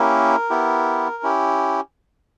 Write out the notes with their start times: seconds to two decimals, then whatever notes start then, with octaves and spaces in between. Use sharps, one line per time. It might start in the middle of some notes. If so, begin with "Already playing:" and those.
Already playing: A#3 C#4 E4 G4 A#4
0.50 B3 E4 G4
1.23 C#4 E4 G4